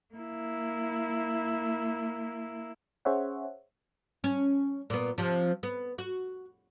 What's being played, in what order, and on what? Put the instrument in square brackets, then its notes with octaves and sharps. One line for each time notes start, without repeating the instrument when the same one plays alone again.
[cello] A#3 E4
[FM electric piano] C#4 G#4 C5 C#5 E5 F#5
[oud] C#4
A#2 B3
C3 F3
B3
F#4